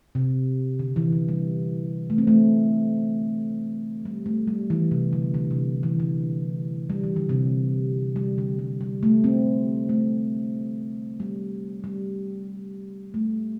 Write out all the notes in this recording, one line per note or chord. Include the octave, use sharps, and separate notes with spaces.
C3
D3
E3
D3
G3
A3
C4
A3
G3
A3
G3
E3
C3
D3
D3
C3
E3
D3
G3
E3
D3
C3
G3
D3
G3
G3
A3
C4
A3
G3
G3
A3